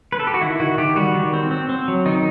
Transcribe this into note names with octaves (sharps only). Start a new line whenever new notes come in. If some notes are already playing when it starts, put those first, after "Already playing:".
B4
A4
G4
F#4
D#3 E4
D#3 F#4
D#3 G4
G3 F#4
D#3
C4
C4
C4
F#3
D#3 D#4